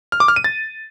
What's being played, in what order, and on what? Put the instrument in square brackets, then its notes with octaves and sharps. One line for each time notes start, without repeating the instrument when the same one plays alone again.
[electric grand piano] F6
D6
F6
D#7
A6